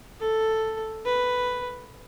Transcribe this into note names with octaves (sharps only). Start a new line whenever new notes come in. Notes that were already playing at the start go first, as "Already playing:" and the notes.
A4
B4